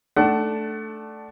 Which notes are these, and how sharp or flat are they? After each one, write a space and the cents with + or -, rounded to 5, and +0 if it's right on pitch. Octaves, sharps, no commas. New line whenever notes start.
A3 -5 D4 +0 F#5 +30